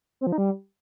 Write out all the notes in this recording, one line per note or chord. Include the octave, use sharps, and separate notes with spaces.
C4
F3
D#4
G3